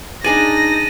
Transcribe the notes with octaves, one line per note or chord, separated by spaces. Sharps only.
D4 D#4 G#4 D5 A6 A#6 D#7 F#7